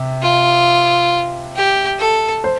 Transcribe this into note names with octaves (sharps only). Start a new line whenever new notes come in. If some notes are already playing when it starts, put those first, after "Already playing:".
Already playing: C3
F4
G4
A4
C5